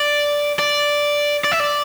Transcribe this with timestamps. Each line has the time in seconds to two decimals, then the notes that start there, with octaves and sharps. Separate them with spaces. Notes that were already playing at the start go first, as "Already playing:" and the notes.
Already playing: D5
0.59 D5
1.44 D5
1.52 E5
1.60 D5